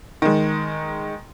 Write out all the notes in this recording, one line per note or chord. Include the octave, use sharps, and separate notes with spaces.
D#3 G#3